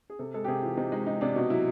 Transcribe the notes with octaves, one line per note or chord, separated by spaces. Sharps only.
G#4
C3 A4
G#3 A4
G4
C3 G#4
E3 F4
C3 D#4
G#3 D#4
G#3 D#4
C3 D4
B2 D#4
F#3 E4